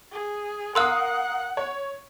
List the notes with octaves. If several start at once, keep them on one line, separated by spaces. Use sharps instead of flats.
G#4
A#4 F5 F#5 C6 D#6 E6 F#6
C#5